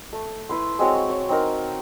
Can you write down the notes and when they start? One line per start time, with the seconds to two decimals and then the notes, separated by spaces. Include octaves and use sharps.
0.13 A3
0.49 E4 B4 C6
0.79 G#3 C4 F#4 C#5
1.10 C#5
1.29 C4 D#4 A#4